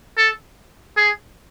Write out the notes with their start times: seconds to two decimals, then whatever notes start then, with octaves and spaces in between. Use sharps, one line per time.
0.17 A4
0.97 G#4